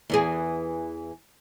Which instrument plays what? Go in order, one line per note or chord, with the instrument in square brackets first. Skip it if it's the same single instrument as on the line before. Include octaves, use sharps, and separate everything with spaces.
[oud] E2 E3 G#4